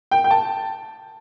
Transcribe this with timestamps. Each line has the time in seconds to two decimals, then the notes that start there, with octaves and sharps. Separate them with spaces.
0.11 G5
0.24 G5
0.31 A5